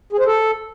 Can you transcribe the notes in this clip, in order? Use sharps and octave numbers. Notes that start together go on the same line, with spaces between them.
G#4
C5
A4